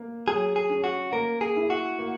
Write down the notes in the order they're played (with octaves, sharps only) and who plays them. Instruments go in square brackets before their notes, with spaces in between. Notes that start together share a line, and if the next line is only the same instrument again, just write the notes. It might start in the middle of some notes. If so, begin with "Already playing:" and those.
Already playing: [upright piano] A#3
[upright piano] F#3 [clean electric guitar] G#4
[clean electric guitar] G#4
[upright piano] C#4
[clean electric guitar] F#4
[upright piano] A#3 [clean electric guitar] A#4
[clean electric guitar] G#4
[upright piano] E4
[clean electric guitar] F#4
[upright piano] A#3